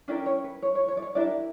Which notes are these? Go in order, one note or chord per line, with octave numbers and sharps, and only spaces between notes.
C#4 D4 E4 G4 A#4 D5
C#5
B4
C#5
C#5
C#5
D5
C#5
D4 E4 G4 A#4 D5